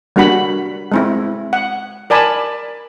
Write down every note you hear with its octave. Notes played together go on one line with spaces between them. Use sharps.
G3 A#3 D4 F#4 F#5 B5
G#3 C4 E4
F#5
A#4 D5 G#5 A5 B5